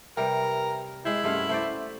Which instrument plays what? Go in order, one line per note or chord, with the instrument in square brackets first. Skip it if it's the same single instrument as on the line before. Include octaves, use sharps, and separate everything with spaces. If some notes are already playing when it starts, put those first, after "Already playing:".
[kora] C3 G3 [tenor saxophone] A#4 [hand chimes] B4 E5 G5
[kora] G#3 C5 [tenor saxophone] E4 [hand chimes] D#5 F#6 G#6
[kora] G2 A3 F5 [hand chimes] C#4 F#5 C6
[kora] A3 C5 D5